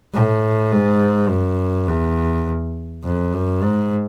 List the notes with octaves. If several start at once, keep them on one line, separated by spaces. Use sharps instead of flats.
A2
G#2
F#2
E2
F2
F#2
G#2